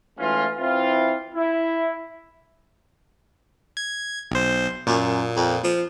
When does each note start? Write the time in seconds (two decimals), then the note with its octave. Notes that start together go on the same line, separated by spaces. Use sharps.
0.19 G#2 E3 A3 C#4 F4
0.58 E3 C4 E4 F4
1.35 E4
3.77 G#6
4.31 B1 C5
4.87 F#2 A#2
5.36 F2
5.64 F3